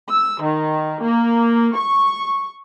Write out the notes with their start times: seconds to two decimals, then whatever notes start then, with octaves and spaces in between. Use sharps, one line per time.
0.10 E6
0.42 D#3
1.03 A#3
1.76 C#6